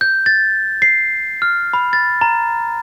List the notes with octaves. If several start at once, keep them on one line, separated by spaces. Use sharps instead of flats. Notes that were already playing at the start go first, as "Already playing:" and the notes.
G6
A6
C7
F6
B5
A6
A#5